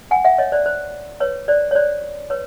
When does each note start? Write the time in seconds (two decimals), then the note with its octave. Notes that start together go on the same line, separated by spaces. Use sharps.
0.11 F#5 G#5
0.25 E5 F#5
0.38 C#5 D#5
0.52 C5 D5
0.66 C5
1.20 B4 C#5
1.48 C5 D5
1.71 C#5
1.75 C5 D5
2.30 B4 C#5